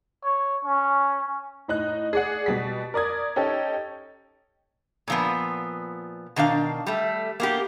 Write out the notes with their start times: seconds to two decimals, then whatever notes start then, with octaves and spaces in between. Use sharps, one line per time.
0.23 C#5
0.65 C#4
1.68 A2 D#4 F#6
2.13 G#4 D5 F#5
2.46 B2 G3 B6
2.94 A#4 D5 D#6 G#6
3.36 C#4 D#4 G4 A4
5.08 A#2 F3 B3
6.36 B2 D#3 D4 F5
6.86 G3 A3
7.40 A#3 B3 G4